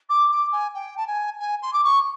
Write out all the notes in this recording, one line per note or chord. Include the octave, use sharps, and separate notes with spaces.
D6
D6
G#5
G5
A5
G#5
G#5
C6
D6
C#6